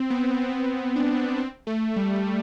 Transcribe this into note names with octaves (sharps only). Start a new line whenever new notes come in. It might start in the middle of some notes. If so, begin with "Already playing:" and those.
Already playing: C4
B3
C4
D4
C4
A3
G3
G3